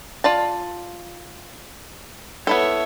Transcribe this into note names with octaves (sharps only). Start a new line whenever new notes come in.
F4 D5 A5
B3 E4 A4 C#5 E5